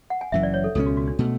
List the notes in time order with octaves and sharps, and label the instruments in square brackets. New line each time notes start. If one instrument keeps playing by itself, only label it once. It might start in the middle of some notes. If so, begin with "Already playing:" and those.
[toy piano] F#5
G#5
[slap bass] F#1 F#2 E3 [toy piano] E5
[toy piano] D5
C#5
A4
[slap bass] C#2 B2 F#3 C#4 [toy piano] A4
[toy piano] F#4
F#4
D4
[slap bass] B2 A3